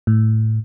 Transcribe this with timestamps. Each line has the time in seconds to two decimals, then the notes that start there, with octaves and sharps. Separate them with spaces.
0.07 A2